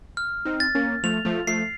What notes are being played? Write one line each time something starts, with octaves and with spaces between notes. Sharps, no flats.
F6
C4 D#4
A6
A#3 C#4
F3 A3 F7
F3 A3
F3 A3 C7